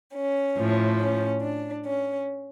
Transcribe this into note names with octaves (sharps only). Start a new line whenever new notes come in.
C#4
A2 F3
C#4
D4
C#4